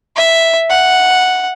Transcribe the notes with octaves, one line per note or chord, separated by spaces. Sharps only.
E5
F#5